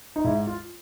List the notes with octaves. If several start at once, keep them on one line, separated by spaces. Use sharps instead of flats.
D#4
G#2 E4
F4